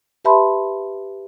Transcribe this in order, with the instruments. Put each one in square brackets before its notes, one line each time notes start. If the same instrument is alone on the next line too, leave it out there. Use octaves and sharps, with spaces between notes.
[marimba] G4 B4 E5 A5 B5 C6